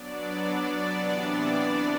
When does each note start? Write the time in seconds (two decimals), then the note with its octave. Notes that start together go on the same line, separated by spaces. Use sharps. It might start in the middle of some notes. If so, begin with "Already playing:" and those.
Already playing: F#3 B3 D4 D5
0.40 D5
0.90 C3 E3 B3 D4